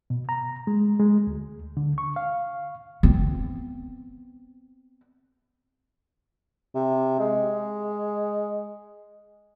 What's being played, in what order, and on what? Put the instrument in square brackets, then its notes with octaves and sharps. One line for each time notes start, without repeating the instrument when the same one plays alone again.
[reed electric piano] B2
A#5
G#3
G#3
D2
D3
C#6
F5
[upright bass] B3 C4
[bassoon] C3
G#3